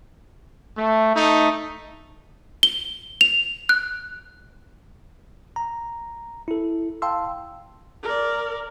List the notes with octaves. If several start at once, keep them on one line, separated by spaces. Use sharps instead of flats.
A3
A3 D#4
G7
F7
F#6
A#5
E4 A4
F5 G5 A5 C6 E6
A#4 D5